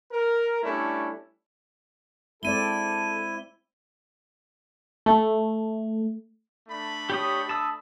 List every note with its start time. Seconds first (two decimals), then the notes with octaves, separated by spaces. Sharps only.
0.11 A#4
0.63 G3 A3 C#4 D4 E4
2.43 G#3 C4 E4 A4 D5 D#7 G7
5.06 A3
6.67 A3 D4 B5
7.10 G4 C#5 D#6
7.49 A5 D#6 E6